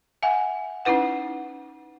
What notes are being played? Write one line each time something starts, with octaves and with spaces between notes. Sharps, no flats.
E5 F#5 G#5
C#4 D#4 E4 B4 F#5